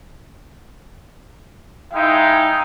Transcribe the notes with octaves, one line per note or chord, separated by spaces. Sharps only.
G#3 D#4 E4 F5 G5